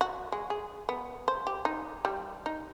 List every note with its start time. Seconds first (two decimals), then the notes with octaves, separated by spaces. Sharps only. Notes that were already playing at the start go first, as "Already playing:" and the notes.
0.01 F#4
0.32 G#3
0.50 G#4
0.89 B3
1.28 C5
1.47 G4
1.65 D#4
2.05 G3
2.46 D#4